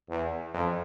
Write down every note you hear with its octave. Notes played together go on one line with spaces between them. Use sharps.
E2
F2